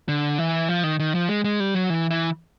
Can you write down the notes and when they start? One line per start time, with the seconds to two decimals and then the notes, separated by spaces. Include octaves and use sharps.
0.08 D3
0.38 E3
0.69 F3
0.84 D#3
1.00 D#3
1.15 F3
1.29 G#3
1.44 G#3
1.60 G3
1.75 F#3
1.90 E3
2.10 E3